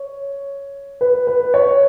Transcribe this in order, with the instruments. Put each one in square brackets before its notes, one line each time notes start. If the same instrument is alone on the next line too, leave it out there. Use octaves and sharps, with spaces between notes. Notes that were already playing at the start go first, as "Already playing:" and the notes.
Already playing: [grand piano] C#5
B4
B4
C#5